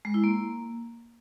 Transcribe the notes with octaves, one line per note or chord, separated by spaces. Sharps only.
G#3
E4
A#3